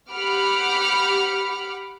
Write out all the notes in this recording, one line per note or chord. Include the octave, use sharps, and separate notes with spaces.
G4 F#5 B5 D6 F6 C#7